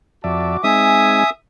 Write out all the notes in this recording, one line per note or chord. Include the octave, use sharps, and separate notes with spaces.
F2 F#4 D5 E5 A5 D6
G#3 C4 D#4 E5 G#5 D#6